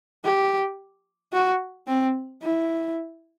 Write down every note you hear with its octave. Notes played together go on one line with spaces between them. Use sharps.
G4
F#4
C4
E4